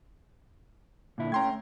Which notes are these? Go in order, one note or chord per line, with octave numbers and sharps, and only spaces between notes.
A#2 D3 E4
A3 C#4 G5 A#5 C6 G#6